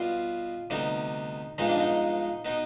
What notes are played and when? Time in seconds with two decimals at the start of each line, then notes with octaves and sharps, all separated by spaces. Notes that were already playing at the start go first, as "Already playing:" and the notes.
Already playing: B2 G3 B3 F4
0.70 D2 C3 G3 B3 D#4
1.58 G2 F3 G#3 B3 D#4
1.69 D4
1.80 D#4
2.45 B2 B3 D#4